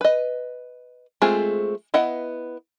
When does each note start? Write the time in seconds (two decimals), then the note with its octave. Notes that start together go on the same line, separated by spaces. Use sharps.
0.01 B4 D#5
1.22 G#3 A3 C4 F4 G#4
1.94 B3 E4 D#5 F#5